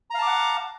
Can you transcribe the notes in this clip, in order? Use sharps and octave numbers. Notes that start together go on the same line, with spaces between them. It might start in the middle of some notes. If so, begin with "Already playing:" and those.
F5 F#5 A5 A#5 D6